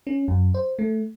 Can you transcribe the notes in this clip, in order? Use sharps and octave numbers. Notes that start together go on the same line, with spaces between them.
C#4
F#2
C5
A3